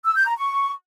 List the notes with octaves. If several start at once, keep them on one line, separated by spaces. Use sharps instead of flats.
E6
G6
A#5
C#6